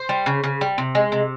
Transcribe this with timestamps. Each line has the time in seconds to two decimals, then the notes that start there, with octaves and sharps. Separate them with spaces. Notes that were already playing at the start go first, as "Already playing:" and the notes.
Already playing: C5
0.09 G3
0.26 C#3
0.44 C#3
0.61 G3
0.78 C3
0.95 G#3
1.12 C3